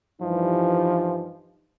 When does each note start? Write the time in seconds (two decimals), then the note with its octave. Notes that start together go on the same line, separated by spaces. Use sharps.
0.22 G2 E3 F3 D#4